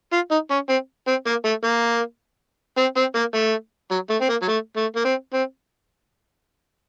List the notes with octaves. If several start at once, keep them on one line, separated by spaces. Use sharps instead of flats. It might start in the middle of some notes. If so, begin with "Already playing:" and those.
F4
D#4
C#4
C4
C4
A#3
A3
A#3
C4
C4
A#3
A3
F#3
A3
C4
A#3
F#3
A3
A3
A#3
C4
C4